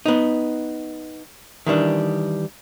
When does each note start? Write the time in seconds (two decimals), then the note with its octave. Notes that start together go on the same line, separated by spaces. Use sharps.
0.06 B3 D#4
1.67 D#3 E3 G3 D4